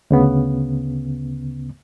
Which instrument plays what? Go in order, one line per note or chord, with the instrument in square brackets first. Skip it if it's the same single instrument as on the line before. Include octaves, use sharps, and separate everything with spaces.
[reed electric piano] D2 C#3 B3